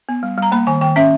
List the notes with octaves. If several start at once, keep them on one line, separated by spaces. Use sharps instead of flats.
B3
G3
G3 A#5
A#3 B5
D#3 G#5
D#3 G5
C#4 E5